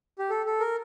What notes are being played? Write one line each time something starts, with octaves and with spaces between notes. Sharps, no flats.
G4
A4
A4
A#4